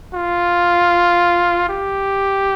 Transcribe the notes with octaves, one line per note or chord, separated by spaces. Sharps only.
F4
G4